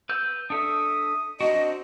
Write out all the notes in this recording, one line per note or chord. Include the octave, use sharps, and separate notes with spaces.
B4 E6 G6
D4 A4 E5 D#6
C4 D4 F#4 D#5